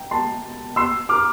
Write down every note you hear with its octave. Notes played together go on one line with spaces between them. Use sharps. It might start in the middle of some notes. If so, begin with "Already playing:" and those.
Already playing: G5
A5 C6
C6 E6
D6 F6